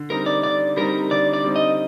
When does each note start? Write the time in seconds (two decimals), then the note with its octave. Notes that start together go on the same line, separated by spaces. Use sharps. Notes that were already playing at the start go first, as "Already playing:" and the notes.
Already playing: D3
0.10 G3 C4 D#4 A#4
0.26 D5
0.43 D3 D5
0.77 G3 C4 D#4 A#4
1.11 D3 D5
1.34 D5
1.44 G3 C4 D#4
1.56 D#5